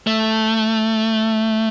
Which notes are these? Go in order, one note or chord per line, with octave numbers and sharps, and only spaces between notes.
A3